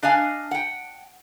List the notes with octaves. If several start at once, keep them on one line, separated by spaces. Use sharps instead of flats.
D4 D#5 F5 G#5
F#5 G5